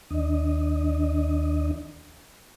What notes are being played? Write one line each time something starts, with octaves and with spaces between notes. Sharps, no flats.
D#2 D4 D#5